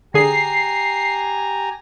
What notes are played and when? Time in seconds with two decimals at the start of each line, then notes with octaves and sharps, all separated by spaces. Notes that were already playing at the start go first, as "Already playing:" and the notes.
0.14 D3 G4 G#4 G#5 A#5 C7